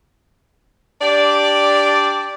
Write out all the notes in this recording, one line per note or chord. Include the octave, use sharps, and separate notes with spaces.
D4 G4 D5